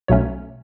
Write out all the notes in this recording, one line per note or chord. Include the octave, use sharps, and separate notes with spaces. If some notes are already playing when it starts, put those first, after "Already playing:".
B1 B2 F#3 A3 C#4 C#5